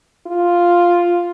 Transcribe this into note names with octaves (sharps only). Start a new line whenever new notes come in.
F4